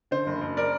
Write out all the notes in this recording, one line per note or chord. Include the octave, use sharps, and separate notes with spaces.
D3 C5
F#1
F#1
A#4 D5